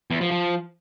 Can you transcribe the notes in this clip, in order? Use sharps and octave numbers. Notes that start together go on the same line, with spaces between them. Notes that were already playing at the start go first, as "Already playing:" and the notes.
E2
F3
F3